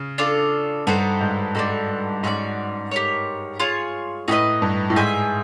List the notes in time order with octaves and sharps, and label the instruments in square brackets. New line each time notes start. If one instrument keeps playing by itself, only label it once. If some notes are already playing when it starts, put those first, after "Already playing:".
Already playing: [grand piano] C#3
[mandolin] D4 F4 A4
[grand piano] G2 [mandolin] D#4 F#4 A4 C5
[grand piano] G#2
[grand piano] G#2 [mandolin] D4 F#4 A4
[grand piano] G#2 [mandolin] C#4 F#4 A4 D5
[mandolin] G4 A#4 C#5
F4 G#4 C#5
[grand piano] A2 [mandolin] D#4 F#4 B4 D#5
[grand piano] G2
A2
[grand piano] G#2 [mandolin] G#4 C5 E5 G#5